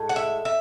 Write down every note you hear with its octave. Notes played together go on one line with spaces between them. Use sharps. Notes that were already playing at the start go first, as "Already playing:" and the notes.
Already playing: A2 G#3
F#5
E5
E5